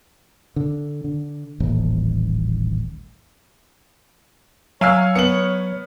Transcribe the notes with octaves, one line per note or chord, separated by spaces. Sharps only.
D3
D3
D#1 A1
F#3 C#5 F5 G#5 E6 F6
B3 C#7 F#7